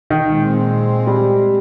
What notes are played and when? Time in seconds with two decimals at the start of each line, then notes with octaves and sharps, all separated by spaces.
0.10 D#3
0.30 A#2 G#3 C4
1.07 G3